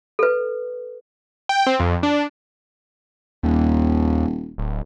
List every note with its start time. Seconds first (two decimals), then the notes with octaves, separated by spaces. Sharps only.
0.19 A4 B4
1.49 G5
1.67 C4
1.80 F2
2.03 D4
3.43 D#1 D#2
4.58 D1